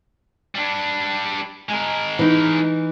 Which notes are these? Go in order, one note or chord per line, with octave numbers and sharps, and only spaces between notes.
G3 D4
G#3 A#4
E3 D#4